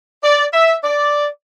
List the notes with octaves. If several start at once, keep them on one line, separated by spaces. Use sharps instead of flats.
D5
E5
D5